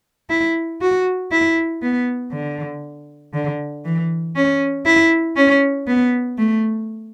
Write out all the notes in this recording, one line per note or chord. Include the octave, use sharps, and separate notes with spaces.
E4
F#4
E4
B3
D3
D3
E3
C#4
E4
C#4
B3
A3